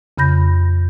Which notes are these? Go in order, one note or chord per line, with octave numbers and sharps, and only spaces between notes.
F2 C#3 B5 G6 A#6